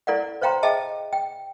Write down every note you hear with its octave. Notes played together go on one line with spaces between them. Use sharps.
E4 A4 D5 F5 F#5
C5 C#5 F5 G5 A#5 C6
G#4 D#5 E5 G5 A5
G5